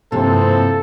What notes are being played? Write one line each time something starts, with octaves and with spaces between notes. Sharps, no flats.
G2 C3 E3 F3 A#3 C4 A4